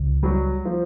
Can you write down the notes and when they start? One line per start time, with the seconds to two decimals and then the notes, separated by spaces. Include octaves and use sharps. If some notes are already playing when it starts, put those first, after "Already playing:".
Already playing: C#2
0.23 F#3 G3
0.65 F3